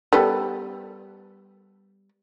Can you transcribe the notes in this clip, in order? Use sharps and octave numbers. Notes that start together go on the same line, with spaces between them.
G3 B3 A4